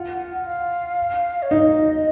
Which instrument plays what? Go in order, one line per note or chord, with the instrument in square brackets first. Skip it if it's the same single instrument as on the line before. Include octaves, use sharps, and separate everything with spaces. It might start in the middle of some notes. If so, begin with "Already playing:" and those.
Already playing: [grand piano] F4 [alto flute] F#5
[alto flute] F5
C#5
[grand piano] D#4 [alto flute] D#5